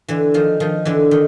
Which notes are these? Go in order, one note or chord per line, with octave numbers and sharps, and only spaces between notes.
D3 E3
D#3 F3
D#3 F3
D3 E3
D#3